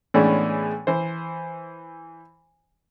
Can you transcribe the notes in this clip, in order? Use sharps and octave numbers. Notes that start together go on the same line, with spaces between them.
A2 E3 G#3 B3 C#4 D4
E3 C5